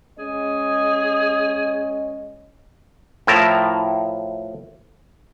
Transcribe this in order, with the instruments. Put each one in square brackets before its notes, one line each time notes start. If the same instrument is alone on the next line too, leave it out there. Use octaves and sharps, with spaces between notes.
[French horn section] G#3 C#4 D#5 [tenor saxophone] G#4
[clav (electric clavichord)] A2 F3 E4 A#4 A5 A#5